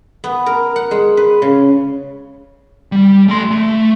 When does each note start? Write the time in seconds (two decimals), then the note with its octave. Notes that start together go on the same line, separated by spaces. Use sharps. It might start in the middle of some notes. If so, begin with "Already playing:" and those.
0.24 B3
0.46 A#4
0.76 F#5
0.91 G#3
1.17 B4
1.42 C#3
2.92 G3
3.28 A3 C6
3.51 A3